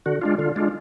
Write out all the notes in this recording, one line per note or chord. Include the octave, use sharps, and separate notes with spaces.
D3 F#4
G#3 D4 F4
D3 F4
G#3 D4 F4